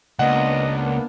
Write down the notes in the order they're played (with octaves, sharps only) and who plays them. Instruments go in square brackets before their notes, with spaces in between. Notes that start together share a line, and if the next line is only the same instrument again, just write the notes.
[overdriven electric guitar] C#2 [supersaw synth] A#3 B3 D4 [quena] D#5 [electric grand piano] F#5